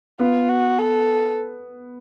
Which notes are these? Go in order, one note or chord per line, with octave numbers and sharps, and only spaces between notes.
B3 F4
F#4
A4